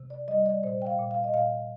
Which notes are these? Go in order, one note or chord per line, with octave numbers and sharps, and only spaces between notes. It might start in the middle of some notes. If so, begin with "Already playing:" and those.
Already playing: C3
D5
G3 D#5
D5
A#2 C5
G5
F5
A#2
F5
D#5
A#2 F5